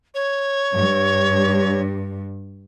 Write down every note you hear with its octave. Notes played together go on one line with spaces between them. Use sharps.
C#5
G2